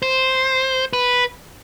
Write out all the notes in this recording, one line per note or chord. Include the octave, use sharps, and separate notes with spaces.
C5
B4